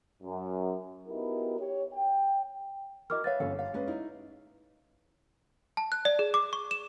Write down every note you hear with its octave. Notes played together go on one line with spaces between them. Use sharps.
F#2
B3 D#4 E4 F#4 G4 A#4
G4 C#5
G5
E4 F#4 A#4 D#5 D6 F6
B4 C#5 E5 F5 A6
G1 C#4 A4 F5
F5
G#3 C#4 B4
D#4 E4
A5
F#6
D5
G#4
D6
C#6
E7